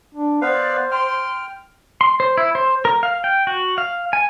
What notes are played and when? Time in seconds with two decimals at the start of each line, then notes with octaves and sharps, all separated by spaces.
0.15 D4
0.42 B3 B4 C5 D5 F5
0.91 G5 C6 F6
2.01 C6
2.20 C5
2.38 E4
2.55 C5
2.85 A#4
3.03 F5
3.24 G5
3.47 F#4
3.78 F5
4.13 G#5